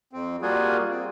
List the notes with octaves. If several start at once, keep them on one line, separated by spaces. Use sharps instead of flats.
F2 C4
G3 A#3 F4 F#4 G#4
C4